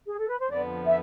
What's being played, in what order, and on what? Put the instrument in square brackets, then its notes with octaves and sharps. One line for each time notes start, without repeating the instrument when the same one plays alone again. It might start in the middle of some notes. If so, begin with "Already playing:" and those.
[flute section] G#4
A4
B4
C5
[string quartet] F2 D3 F3 B3 [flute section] D5
[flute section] E5